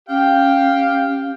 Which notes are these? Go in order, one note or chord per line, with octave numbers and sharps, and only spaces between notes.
C#4 G4 F5 G5